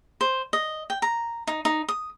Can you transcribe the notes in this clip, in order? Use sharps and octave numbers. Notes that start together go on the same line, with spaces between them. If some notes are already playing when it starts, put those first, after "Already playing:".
C5
D#5
G5
A#5
D#4
D#4
D#6